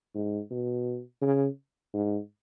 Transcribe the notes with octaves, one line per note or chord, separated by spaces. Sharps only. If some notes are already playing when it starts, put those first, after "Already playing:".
G#2
B2
C#3
G#2